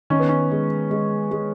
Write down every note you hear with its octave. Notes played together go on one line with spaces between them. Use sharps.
D#3 C#4
B3
C#4
G#3
G#3
G#3